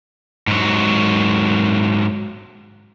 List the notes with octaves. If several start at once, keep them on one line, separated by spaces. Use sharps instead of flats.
G#2 F#3